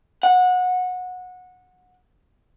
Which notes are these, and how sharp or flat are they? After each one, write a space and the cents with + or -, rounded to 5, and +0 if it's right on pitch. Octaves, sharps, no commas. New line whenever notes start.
F#5 -20